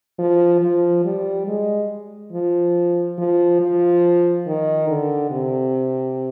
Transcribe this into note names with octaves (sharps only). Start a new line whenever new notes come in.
F3
F3
G3
G#3
F3
F3
F3
D#3
D3
C3